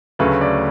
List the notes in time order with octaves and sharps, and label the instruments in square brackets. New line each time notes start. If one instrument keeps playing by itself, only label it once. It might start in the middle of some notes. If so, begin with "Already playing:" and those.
[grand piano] D2 C#3 F#3 A3 B4
D5